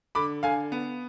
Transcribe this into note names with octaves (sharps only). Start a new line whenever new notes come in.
D3 B5 D6
D3 F5 G#5
B3